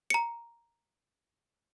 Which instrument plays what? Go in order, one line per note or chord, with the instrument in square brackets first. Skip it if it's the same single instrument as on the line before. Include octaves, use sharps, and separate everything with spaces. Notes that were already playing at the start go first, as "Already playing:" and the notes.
[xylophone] A#5 C#7